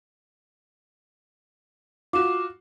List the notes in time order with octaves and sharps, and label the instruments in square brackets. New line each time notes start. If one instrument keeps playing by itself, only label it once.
[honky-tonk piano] F4 F#4 [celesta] D6 E7